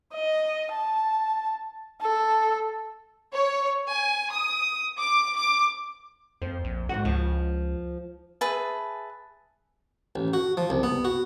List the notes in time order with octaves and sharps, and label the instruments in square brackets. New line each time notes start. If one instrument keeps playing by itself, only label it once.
[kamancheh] D#5
A5
A4
[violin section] C#5
G#5
D#6
D6
D6
[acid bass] F2 [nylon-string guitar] C5
[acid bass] A#1
[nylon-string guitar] G#2 D#3 F#5 [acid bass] F#4
[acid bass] C#2 [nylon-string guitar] F3
[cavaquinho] G#4 B4 E5 A5
[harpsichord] A1
F#4
F3
C2
B3
F#4